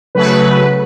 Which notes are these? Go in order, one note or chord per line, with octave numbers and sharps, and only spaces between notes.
C#3 F#3 A3 B4